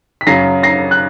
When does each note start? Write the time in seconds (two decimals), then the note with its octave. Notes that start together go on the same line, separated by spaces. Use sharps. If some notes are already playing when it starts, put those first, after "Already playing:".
0.21 B6
0.27 F#2 C#3 F#3 A#6 C7
0.63 A#6 C7
0.91 F#6